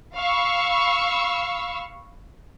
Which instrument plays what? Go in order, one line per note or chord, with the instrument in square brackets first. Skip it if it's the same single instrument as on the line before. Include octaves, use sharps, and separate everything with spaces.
[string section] F5 B5 C#6 E6